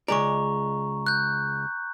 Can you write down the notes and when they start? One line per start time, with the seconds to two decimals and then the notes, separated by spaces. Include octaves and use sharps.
0.08 C#2 G#3 D5 A#5 C#6
1.07 F#6 G6